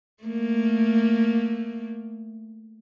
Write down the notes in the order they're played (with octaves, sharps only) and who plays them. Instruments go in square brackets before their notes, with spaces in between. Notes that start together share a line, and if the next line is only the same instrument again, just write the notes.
[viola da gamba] A3 A#3